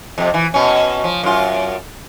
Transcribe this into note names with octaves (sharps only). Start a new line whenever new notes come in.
F2 C3
E3
B2 C#4
F3
F#2 F4